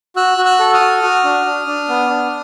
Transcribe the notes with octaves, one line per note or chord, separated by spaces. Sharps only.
F#4 E6 F#6
F#4
E6 F#6
A4
D#6 F6
F#4
F#4
D4
D4
D4
B3
D4